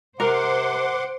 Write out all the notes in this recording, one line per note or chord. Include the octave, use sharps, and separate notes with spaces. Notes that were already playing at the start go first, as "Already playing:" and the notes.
C3 A#4 C5 F#5 C6 D6